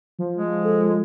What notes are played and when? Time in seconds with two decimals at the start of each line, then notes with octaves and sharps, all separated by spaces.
0.19 F3
0.37 G#3
0.64 A4